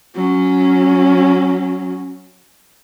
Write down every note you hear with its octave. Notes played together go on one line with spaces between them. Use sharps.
F#3 C#4